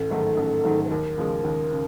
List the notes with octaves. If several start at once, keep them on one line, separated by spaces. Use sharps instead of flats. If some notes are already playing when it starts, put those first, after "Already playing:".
Already playing: A1 A4
G#2 D#3 F#3 A3
A1
G#2 D#3 F#3 A3
B4
D#2 A#4
C#3 F3 G#3
D#2
C#3